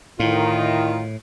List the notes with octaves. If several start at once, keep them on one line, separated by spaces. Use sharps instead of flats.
D2 A2 D#3 E4 F4